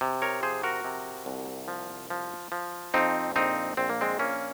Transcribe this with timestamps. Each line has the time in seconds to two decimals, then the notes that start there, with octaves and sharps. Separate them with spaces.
0.01 C3
0.22 A#4 C#5
0.43 F3 G#4 C5
0.63 F#4 A#4
0.84 C3
1.26 C2
1.68 F3
2.10 F3
2.52 F3
2.94 F2 C4 D#4
3.36 A#1 C4 D#4
3.77 A#1 C4
3.90 A#3
4.01 G#3 C4
4.19 A#1 A#3 C#4